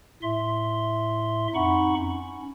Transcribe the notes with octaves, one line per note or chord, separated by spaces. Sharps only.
A2 E5 C6
F2 D#4 F#5 B5 C#6
C#4